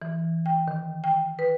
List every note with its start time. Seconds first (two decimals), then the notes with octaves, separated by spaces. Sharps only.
0.02 E3
0.46 G5
0.68 D#3
1.04 G5
1.39 B4